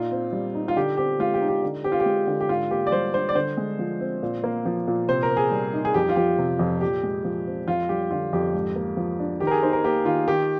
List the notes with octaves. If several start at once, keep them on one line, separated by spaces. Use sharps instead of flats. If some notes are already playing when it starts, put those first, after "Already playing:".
Already playing: A#2 D#4 F4
C4
G3
D#4
F4
D3 G4
C4 G4
G#3 F4
G4
D#4
G4
D3
C4 G4
F4
G4
G#3
D3
G4
G#2 F4
A#3 G4
D5
G3 C5
D4 C5
D5
D3 C5
G#3
F3
C4
A#2
A#3
F3
A#2
C3 C5
A#4
C4
G#4
G3
D#4
G#4
F2 G4
F4
F3 G4
C3
F2
A#2 G4
G#3
F3
C4
F2 F4
G3 G4
D3 F4
F2 G4
G#2
A#3
F3
D4
D#3 G4
A#4
G#4
D#4 C5
A#4
A#3 G4
D#3 F4
D#3 G4